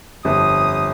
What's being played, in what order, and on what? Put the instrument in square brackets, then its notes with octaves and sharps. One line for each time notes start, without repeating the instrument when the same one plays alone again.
[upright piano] G1 F2 [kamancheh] D#6